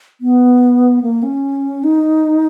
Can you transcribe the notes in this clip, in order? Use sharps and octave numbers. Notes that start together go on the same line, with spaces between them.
B3
A#3
C#4
D#4